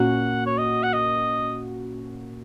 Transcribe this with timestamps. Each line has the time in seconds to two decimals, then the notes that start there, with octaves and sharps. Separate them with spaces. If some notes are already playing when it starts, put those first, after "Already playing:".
Already playing: A#2 A#3 C#4 F#4 F#5
0.46 C#5
0.58 D#5
0.83 F#5
0.93 D#5